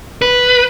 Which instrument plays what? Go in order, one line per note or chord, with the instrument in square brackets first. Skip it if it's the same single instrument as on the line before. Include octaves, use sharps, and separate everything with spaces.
[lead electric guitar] B4